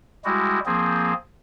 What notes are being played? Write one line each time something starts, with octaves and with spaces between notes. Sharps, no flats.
G3 G#3 E4 F#4
F3 A#3 C4 G#4